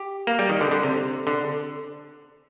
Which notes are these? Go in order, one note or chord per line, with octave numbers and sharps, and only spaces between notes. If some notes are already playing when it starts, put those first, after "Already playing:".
Already playing: G4
A#3
G3
D#3
D3
D3
C3
D3